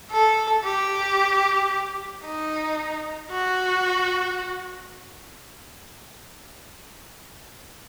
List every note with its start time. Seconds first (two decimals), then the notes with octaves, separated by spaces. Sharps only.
0.11 A4
0.65 G4
2.24 D#4
3.31 F#4